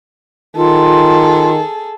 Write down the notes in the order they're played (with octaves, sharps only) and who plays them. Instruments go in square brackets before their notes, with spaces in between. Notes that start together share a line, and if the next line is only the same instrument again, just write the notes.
[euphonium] D#3 [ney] F4 [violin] G#4 A4